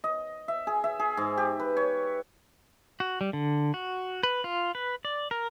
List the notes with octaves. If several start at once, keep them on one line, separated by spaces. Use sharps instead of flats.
D#5
E5
G#4
E5
G#4
G#2
G4
B4
C#5
F#4
G3
D3
F#4
B4
F4
B4
D5
A#4